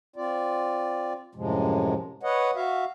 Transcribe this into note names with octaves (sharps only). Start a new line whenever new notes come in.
C4 F4 D5
F#2 A2 C3 F3 G#3
B4 C#5 D#5 F#5
F#4 E5 F5